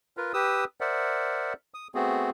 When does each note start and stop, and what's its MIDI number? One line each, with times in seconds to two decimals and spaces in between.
0.17 0.32 65
0.17 0.32 70
0.17 0.32 71
0.34 0.65 67
0.34 0.65 71
0.34 0.65 87
0.34 0.65 88
0.81 1.53 70
0.81 1.53 72
0.81 1.53 74
0.81 1.53 76
0.81 1.53 78
1.74 1.88 87
1.95 2.30 57
1.95 2.30 59
1.95 2.30 60
1.95 2.30 66
1.95 2.30 68